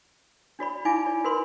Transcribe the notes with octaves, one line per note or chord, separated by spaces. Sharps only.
D4 F#4 D5 B5
D#4 E4 F5 G#5 B5 D6
D5
F#4 A#4 B4 B5 C6